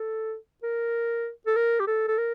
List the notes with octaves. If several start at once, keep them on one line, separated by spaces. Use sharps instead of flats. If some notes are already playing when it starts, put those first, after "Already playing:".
Already playing: A4
A#4
A4
A#4
G4
A4
A4
A#4